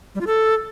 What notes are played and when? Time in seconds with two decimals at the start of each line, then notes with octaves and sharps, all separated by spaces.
0.15 G3
0.21 F4
0.27 A4